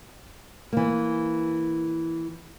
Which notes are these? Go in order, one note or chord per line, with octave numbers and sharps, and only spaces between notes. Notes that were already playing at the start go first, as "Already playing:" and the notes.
E3 A#3